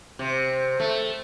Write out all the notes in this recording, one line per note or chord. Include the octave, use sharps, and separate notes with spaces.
C3
A3